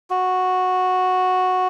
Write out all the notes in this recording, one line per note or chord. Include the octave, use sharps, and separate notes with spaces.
F#4